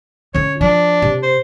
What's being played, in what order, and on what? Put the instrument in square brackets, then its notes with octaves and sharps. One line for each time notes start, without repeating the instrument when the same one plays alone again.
[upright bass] D3 C#4 [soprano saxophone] C#5
[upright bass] F3 [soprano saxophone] D4
[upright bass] C3
[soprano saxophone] C5